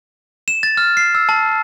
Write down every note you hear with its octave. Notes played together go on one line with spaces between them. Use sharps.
E7
A6
F6
C7
E6
A5